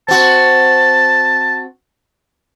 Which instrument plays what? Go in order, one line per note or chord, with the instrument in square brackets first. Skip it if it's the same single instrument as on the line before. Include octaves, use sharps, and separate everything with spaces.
[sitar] C4 F#4 [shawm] A5